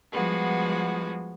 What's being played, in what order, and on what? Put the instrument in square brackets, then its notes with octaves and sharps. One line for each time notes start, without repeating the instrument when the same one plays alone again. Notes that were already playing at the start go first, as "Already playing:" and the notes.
[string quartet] F3 G3 G#3 B3 F#4